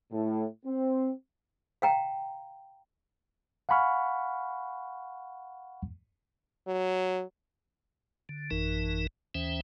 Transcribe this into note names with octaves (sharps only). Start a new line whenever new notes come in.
A2
C4
F5 G5 A#5
F5 F#5 G#5 B5 C#6 F6
F#3
D3
A1 F#2 E3 D#4 A#4
D#2 E3 C#4 C5 E5 G5